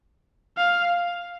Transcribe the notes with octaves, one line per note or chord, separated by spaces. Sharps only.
F5